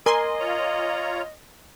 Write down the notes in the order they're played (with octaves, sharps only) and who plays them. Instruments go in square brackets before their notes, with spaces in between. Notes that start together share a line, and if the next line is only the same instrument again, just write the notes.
[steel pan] A#4 [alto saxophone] D#5 [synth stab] G#5 C6
[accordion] F4 C#5 A#5